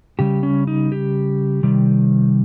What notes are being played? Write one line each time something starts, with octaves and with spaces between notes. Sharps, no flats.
C#3 G3 G4
C#4
D#4
G4
C3 D#3 G3